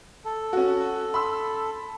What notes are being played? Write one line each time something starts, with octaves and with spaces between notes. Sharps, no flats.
A4
C#4 F#4
B5 C6 E6